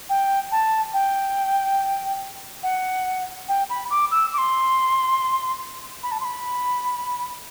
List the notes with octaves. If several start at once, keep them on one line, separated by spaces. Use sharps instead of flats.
G5
A5
G5
F#5
G5
B5
D6
E6
D6
C6
B5
A5
C6
B5